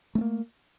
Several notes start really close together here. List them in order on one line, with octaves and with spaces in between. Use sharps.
A3 C4 A#3